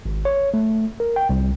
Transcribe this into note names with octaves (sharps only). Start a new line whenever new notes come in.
G#1
C#5
A3
A#4
G5
C2